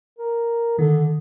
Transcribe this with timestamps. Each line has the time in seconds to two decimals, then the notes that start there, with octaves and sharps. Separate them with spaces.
0.19 A#4
0.79 D3 D#3